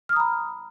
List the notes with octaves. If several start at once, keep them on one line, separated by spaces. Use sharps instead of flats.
A#5 B5 D#6 F6